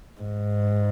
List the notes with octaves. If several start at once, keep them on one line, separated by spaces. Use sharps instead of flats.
G#2